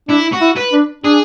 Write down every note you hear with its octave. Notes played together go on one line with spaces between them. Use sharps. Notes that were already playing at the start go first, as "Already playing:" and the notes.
D4 E4
F#4
E4
B4
D4
D4 G#4